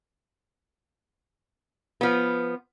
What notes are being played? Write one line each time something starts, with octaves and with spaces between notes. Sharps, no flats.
F3 B3